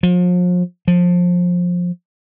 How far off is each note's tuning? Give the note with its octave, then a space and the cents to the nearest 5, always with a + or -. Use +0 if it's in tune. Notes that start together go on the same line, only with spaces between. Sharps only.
F3 +40
F3 +20